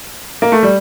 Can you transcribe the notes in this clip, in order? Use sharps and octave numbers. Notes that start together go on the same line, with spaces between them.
A#3
A3
G3